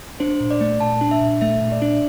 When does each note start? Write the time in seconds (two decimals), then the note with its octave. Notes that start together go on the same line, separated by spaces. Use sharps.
0.20 D4 C5
0.40 A#2
0.51 D5
0.61 A3
0.80 A#2 A5
1.01 D4
1.11 E5
1.21 A#2
1.41 A3 E5
1.61 A#2
1.72 D5
1.82 D4